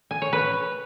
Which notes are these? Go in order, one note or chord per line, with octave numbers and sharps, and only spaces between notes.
G#5
C#5
B4